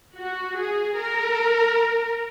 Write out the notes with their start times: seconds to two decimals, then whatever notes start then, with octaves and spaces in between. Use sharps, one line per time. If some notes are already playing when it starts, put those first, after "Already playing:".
0.18 F#4
0.59 G#4
1.00 A#4